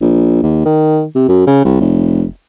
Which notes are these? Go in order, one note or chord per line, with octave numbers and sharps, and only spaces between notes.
A#1
D#2
D#3
C3
F#2
C#3
C2
F1